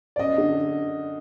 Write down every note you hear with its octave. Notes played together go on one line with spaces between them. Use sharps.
D5
F#2 D#5
D3